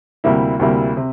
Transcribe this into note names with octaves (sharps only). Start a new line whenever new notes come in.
D2 C3 G3 A#3 E4
D2 C3 G3 A#3 E4
C3